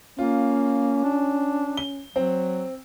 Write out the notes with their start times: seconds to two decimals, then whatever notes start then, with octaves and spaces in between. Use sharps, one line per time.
0.19 A#3 C#4 F4
1.04 D4
1.77 G7
2.16 F#3 C4